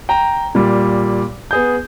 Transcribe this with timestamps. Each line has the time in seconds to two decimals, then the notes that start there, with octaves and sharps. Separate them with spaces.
0.09 G5 A#5
0.55 A#2 G3
1.51 B3 G#4 G6